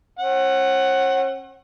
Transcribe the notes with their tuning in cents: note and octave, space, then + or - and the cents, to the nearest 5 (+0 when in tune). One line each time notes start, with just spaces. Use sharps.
C#4 -40 F#5 +15